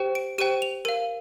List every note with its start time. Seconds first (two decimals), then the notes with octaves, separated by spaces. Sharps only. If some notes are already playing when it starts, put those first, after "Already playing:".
Already playing: G4 C5 G5
0.15 D7
0.38 G4 C5 G5 D#7
0.62 F7
0.85 A#4 F5 D#7